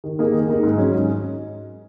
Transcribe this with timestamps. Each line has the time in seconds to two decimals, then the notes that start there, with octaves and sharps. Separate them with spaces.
0.04 D#3
0.19 A#3 D#4 G#4
0.33 D#3
0.48 A#3 D#4 G#4
0.63 G#2
0.78 F#3 C#4 G#4
0.93 G#2